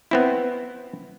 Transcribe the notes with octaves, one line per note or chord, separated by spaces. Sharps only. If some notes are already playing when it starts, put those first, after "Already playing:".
B3 C4 E4